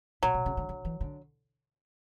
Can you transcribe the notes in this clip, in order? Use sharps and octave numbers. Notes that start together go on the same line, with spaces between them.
A#2 F#3
B2
C#3
D3
D3
E3
D3